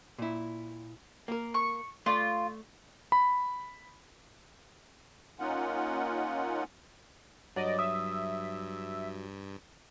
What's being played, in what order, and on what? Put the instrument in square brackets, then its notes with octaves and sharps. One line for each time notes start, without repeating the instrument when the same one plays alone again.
[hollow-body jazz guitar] A#2 E4
A#3 A#4
[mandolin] C#6
[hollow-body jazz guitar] A3 D5 [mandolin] F4
[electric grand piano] B5
[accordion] A#3 C#4 D#4 F4 F#5
[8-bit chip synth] G2 [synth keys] F#3 [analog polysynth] D5 D#5
[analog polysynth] E5 [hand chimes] D#6